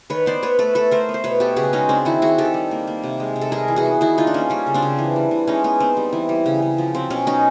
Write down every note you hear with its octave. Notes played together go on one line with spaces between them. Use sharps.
D#3 B4 C#5
B3 C5 D5
B3 B4 C#5
A3 A4 B4
A3 A4 B4
A3 A#4 C5
B3
C5
B2 B4 C#5
B3 G4 A4
C#3 F#4 G#4
G#3 C#4 D#4
C#3 C4 D4
D#3 E4 F#4
D#3 F#4 G#4
D#3 G4 A4
G3
A#3
A#3
C3
G#3
C3
A4
G3 G#4 A#4
E3
F#4 G#4
B3
D#3 E4 F#4
D#3 D#4 F4
D4
A#3 C#4
G3 C#4
C#3
C4 D4
C#3
E3
G3
E3
G#3 C#4 D#4
B3 C#4
B3 C4
G3
E3
G3
C#3
C#3
F3
F#3 C4
B2 C#4
F#3 C#4 D#4